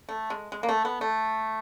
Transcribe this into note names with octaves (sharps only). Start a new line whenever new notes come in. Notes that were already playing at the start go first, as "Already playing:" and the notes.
A3
G#3
G#3
A#3
A3
B3
A3